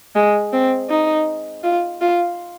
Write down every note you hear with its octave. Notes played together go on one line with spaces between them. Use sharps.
G#3
C4
D#4
F4
F4